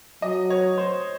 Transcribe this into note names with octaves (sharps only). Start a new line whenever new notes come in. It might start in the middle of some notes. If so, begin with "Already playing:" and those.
F#3 D#5
C#5
C5